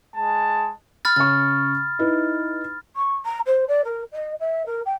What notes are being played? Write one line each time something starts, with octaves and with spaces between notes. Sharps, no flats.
G#3 A5
B5 F6 A6
C#3 C#6 A6
D#4 E4 B4
C#6
A#5
C5
D5
A#4
D#5
E5
A#4
G5